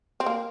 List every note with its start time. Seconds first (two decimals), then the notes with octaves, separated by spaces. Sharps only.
0.20 C4
0.26 A#3